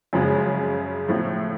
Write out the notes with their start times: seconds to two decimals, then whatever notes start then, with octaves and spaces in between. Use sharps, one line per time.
0.13 F#2 C#3 F3 G#3
1.08 A2 F3 A3